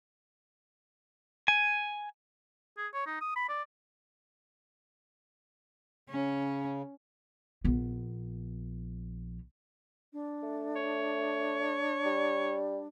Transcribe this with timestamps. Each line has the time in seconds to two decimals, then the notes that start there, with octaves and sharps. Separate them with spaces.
1.48 G#5
2.77 G#4
2.93 C#5
3.06 D#4
3.21 D#6
3.36 B5
3.49 D5
6.09 C#3 C#4
7.65 A#1 B3
10.13 D4
10.43 A3
10.76 C#5
12.06 G3